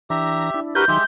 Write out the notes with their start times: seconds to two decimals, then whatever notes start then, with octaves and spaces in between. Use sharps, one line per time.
0.10 E3 D4 G4 E5 A#5
0.54 D4 E4
0.75 F#4 G4 A#4 B4 G6
0.88 D#3 F#3 G#3 D#4 G4 E5 C6